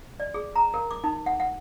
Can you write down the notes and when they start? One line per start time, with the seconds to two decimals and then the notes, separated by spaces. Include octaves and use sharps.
0.20 D5
0.34 G#4
0.56 A#5
0.74 A#4
0.91 D6
1.04 D#4
1.26 F#5
1.40 F#5